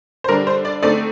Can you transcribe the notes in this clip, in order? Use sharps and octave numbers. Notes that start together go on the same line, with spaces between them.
C5
D3 G3 D4 A#4
C5
D5
D3 A3 C4 D#4 D5